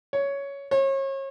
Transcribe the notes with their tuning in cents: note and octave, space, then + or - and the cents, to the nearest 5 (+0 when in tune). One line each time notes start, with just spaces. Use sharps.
C#5 +10
C#5 -35